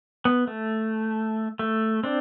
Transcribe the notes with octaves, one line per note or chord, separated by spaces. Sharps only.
B3
A3
A3
C4 D4